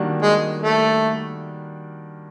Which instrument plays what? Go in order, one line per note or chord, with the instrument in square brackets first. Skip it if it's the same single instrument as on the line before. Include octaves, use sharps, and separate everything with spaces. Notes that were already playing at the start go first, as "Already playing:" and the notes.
Already playing: [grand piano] D#3 G3 A#3 D4 F#4
[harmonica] G#3
A3